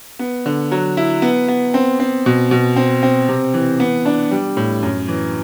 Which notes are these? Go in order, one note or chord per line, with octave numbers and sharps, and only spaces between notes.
B3
D3
F#3
E4
B3
B3
C4
C4
B2
B2
C4
C4
C3
E3
B3
D4
G3
A2
F#2
E3